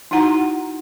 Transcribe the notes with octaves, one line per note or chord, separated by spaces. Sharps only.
D#4 E4 F#4 F#5 A#5